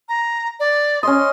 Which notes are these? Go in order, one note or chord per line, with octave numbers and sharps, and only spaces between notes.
A#5
D5
C#4 D#5 C6